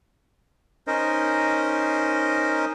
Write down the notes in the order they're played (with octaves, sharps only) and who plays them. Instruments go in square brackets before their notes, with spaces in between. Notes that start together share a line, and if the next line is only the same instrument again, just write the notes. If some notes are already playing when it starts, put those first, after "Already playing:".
[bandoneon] C#4 D#4 A#4 C5 D#5